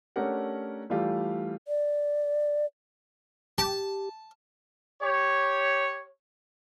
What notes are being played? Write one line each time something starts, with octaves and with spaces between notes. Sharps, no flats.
A3 C#4 D4 G4 A#4 F#5
E3 G3 A3 F4 G4
D5
G4 A5
G4 C#5